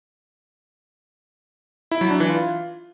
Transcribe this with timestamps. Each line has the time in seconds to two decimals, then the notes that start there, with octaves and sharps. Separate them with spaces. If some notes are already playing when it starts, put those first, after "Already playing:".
1.91 E4
2.01 F#3
2.11 D4
2.20 E3
2.30 F4